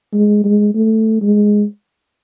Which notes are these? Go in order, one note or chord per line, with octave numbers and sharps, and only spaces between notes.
G#3
G#3
A3
G#3